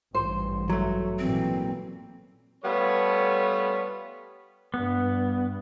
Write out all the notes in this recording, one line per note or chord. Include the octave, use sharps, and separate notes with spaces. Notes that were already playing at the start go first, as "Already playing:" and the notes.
A1 G2 C5
F#3 A3
A#2 E3 C4
G3 A3 B3 F4 A4 C#5
G2 B3